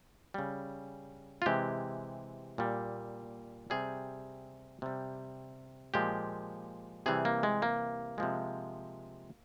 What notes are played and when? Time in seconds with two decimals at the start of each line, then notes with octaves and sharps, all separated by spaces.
0.34 C#3 G3
1.42 F4
1.46 C3 E3 G#3 G4
2.58 A#2 G3
3.70 C3 G3 G#4
4.82 C3 G3
5.94 A#2 F3 G#3 G4
7.06 C3 E3 G3 G#4
7.25 A#3
7.43 G#3
7.62 A#3
8.18 C3 F3 G#3